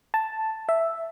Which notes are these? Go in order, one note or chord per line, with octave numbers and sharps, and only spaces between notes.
A5
E5